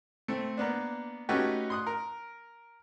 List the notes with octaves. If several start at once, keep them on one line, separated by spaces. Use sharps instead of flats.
A3 C4
A#3 B3 D4
A3 C#4 D#4 F#4 G4 B4
C6 D#6 F#6
A#4